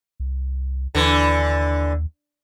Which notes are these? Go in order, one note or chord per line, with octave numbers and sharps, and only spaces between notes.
C2
D#2 D3 E3